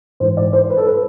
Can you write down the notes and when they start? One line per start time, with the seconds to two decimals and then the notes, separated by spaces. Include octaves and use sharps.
0.20 G#2 E3 C5
0.37 D5
0.53 C5
0.70 B4
0.77 A4
0.86 B4